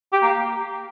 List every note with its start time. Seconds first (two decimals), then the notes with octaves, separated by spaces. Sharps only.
0.13 G4
0.23 A#3